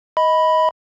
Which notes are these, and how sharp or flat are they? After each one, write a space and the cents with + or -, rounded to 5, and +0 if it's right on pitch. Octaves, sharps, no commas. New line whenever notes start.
D#5 +20 B5 +0